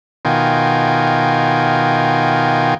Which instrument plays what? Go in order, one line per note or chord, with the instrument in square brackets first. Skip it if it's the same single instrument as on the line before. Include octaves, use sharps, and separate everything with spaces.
[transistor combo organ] B2 D#3 F4 G5 G#5